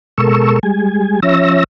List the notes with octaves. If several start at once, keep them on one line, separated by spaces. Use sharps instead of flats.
B2 G#3 A4 A#4 C#6 E6
G3 G#3 G#5
F3 C#4 C#5 E5 E6 A#6